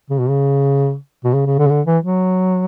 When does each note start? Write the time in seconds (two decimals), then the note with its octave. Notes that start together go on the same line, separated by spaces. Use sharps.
0.10 C#3
0.19 B2
0.29 C#3
1.24 B2
1.34 C#3
1.46 C#3
1.59 D3
1.66 C#3
1.70 D3
1.87 E3
2.03 F#3